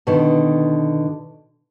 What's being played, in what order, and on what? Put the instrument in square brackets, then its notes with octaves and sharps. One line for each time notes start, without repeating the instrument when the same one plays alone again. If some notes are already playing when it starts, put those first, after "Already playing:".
[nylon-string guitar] B2 D3 D#3